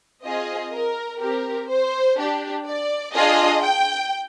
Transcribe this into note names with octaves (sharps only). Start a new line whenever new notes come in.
C4 F4 G#4 D#5
A#4
C4 G4 A#4
C5
D4 G4
D5
D4 F4 G#4 D#5
G5